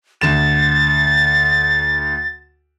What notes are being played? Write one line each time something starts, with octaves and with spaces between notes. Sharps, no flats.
D2 A6 E7